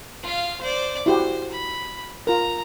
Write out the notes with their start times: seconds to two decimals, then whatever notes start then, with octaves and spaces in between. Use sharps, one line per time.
0.23 F4 F5
0.61 C5 D5
1.06 E4 F#4 G4 C5
1.50 B5
2.27 F4 A#4 A#5